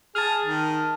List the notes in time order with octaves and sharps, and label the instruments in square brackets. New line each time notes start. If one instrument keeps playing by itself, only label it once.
[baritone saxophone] G#4 [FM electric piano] A5 F6
[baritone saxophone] D#3